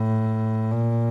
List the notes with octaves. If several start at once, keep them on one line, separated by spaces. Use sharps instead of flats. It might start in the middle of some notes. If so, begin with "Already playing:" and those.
Already playing: A2
A#2